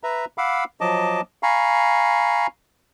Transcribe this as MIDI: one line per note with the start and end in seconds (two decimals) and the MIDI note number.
0.03 0.25 71
0.03 0.25 76
0.03 0.25 82
0.38 0.64 77
0.38 0.64 78
0.38 0.64 83
0.38 0.64 86
0.38 0.64 88
0.81 1.21 53
0.81 1.21 54
0.81 1.21 75
0.81 1.21 81
0.81 1.21 86
1.43 2.47 77
1.43 2.47 80
1.43 2.47 82
1.43 2.47 83
1.43 2.47 85